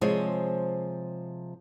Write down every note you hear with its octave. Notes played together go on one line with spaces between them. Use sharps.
C3 F3 G#3 G#4 C5 C#5